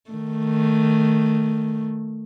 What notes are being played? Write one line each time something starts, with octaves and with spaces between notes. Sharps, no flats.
D#3 A3